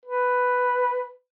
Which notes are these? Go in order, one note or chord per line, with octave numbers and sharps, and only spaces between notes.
B4